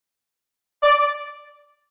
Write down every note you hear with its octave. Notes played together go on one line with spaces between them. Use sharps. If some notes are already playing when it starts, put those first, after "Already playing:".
D5